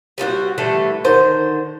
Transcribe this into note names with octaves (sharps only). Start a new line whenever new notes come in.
G3 C4 F4 F#4
D3 E3 G3 A3
D3 D#3 C5